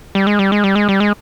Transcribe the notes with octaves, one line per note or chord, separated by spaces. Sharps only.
G3
G#3
G3
G#3
G3
G#3
G3
G#3